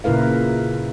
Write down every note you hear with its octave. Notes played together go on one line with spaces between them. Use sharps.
A#2 C#3 E4 A#4 B4 F5